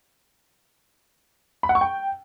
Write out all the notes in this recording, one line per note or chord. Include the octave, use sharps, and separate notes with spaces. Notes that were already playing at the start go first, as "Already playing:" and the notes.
B5
F#5
C#6
G5